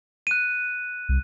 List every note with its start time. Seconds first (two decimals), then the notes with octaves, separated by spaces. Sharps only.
0.27 F#6 D#7
1.09 C2